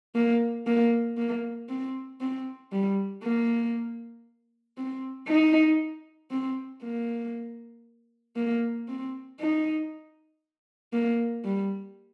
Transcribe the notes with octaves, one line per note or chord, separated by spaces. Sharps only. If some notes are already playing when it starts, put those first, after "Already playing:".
A#3
A#3
A#3
C4
C4
G3
A#3
C4
D#4
C4
A#3
A#3
C4
D#4
A#3
G3